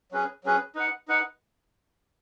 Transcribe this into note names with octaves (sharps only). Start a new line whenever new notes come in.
F#3 C#4 G#4 B4
F#3 C#4 G#4 B4
D#4 B4 F#5
D#4 B4 F#5